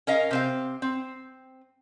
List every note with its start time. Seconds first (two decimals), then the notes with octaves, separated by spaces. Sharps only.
0.07 C#4 A#4 D#5 F5
0.31 C3 C4 F5
0.82 C4